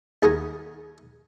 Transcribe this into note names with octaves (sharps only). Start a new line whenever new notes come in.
D#2 G#4 A#4 F#5 G#5 A#5